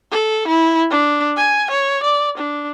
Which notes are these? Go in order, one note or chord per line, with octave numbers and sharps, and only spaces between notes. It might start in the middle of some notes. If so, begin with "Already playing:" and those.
A4
E4
D4
G#5
C#5
D5
D4